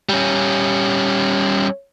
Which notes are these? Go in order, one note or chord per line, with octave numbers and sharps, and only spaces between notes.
G3 C#4